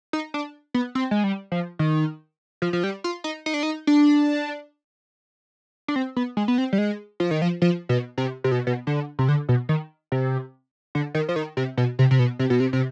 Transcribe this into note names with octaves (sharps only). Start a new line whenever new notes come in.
D#4
D4
B3
C4
G#3
G3
F3
D#3
F3
F3
G3
F4
D#4
D#4
D4
D#4
D4
D4
C4
B3
G#3
B3
C4
G3
G#3
F3
D#3
F3
F3
B2
C3
C3
B2
B2
D3
C3
D3
B2
D#3
C3
D3
D#3
F3
D#3
C3
B2
C3
C3
B2
C3
B2
C3
C3